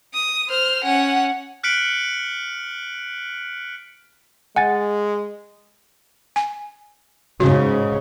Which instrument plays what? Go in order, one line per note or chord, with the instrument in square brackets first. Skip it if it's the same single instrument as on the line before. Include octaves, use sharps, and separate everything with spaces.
[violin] D#6
C5 F6
C#4 F#5
[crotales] F6 F#6 B6 C#7 D7 F#7
[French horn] G#3 [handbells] F#5 G#5 A6
[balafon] G#5
[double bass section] G#2 C#3 [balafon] F#4